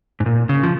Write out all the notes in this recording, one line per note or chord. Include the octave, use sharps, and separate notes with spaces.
G#2
A#2
C#3
F3